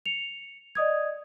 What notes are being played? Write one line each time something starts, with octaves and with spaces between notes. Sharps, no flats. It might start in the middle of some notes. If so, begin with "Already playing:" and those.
C#7 F7
D5 D#5 D#6 G#6